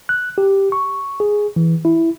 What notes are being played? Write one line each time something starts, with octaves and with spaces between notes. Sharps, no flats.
F#6
G4
C#6
G#4
E3
E4